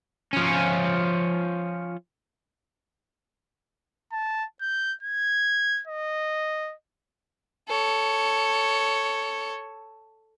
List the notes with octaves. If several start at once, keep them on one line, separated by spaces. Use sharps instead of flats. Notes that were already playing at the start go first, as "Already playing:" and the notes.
F3 C#4
A5
G6
G#6
D#5
A4 C#5